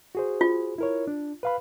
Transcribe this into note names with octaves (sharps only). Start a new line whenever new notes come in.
F#4 G#4 C5
F4
E4 A#4 C#5
D4
B4 F5 B5